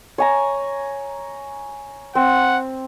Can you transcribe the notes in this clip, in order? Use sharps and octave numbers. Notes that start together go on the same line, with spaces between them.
C#5 G#5 A#5
C4 F#5